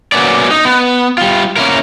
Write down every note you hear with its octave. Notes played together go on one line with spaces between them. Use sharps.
F#3 A#3 B3 C#4 D5
D#4
B3
G3 F4
A#3 C#4 E4 A#4